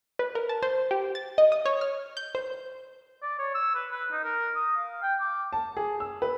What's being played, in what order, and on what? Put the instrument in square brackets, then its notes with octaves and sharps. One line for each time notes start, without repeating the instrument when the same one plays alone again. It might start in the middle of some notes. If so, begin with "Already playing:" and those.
[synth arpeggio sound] B4
A#4
A5
C5
G4
A6
D#5
D#6
C#5
F6
G6
C5
[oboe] D5
C#5
E6
B4
B4
D#4
A#4
D#6
F5
G5
D6
[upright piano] A5
G#4
E6
B4